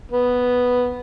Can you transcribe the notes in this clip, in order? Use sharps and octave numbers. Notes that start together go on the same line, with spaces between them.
B3